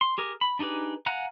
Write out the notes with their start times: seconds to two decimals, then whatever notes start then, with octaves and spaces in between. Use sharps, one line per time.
0.01 C6
0.18 G4 G#4 A#4
0.41 B5
0.59 D4 D#4 G4 G#4 B4
1.06 F5 F#5 G#5 A#5 F#6